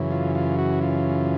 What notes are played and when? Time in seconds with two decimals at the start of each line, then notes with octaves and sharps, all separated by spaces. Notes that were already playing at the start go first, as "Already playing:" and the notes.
Already playing: F#2 C#3 E3
0.11 F4
0.35 F4
0.59 F#4
0.82 F4